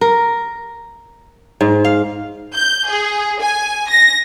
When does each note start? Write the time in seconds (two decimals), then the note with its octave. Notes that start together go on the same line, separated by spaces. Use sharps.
0.01 A#4
1.61 G#2
1.85 F5
2.54 G6
2.89 G#4
3.41 G#5
3.89 A#6